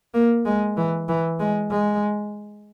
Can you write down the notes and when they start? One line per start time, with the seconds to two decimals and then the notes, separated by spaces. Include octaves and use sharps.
0.14 A#3
0.45 G#3
0.77 E3
1.08 E3
1.40 G#3
1.71 G#3